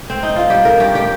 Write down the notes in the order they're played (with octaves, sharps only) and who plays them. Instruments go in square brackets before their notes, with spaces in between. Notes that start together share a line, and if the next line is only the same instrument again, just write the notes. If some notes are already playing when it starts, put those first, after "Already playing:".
Already playing: [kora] A#3
C4
D#4
F4
G3 G4
D#3 A#4
G2 G4
G3 G4